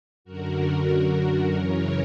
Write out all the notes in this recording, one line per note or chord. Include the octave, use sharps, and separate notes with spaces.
F#2 D3 F#4 A#4
F#2 C#3 E3 A#4 C#5